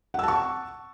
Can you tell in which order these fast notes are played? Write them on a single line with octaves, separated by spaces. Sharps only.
F#5 E6 A5 C#6